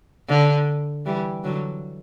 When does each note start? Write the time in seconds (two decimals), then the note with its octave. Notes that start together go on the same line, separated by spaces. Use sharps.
0.29 D3
1.05 E3 G3
1.44 D3 F#3